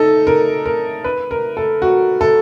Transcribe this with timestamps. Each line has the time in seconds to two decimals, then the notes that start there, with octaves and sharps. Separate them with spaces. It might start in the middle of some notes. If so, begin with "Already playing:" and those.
Already playing: D#4 A4
0.27 A#4
0.66 A#4
1.04 B4
1.31 A#4
1.57 A4
1.82 F#4
2.21 A4